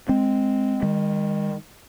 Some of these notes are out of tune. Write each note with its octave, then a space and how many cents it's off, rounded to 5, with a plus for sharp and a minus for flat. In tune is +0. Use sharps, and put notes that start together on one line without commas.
G#3 +0 C4 +0
D#3 +5 G#3 -40